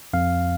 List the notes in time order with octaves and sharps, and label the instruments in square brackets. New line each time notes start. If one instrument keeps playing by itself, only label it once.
[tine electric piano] F2 F5